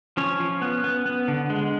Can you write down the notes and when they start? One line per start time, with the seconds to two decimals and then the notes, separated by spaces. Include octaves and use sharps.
0.17 F3 C#4 C#5
0.40 F3
0.62 B3
0.84 B3
1.06 B3
1.28 D3
1.50 G#3